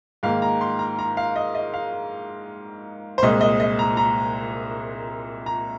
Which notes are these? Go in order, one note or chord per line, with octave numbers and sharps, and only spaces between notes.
G#2 D#3 A#3 F5
A#5
C6
A#5
A#5
F5
D#5
D#5
F5
C5
C2 A#2 G#3 D#5
D#5
D#5
A#5
A#5
A#5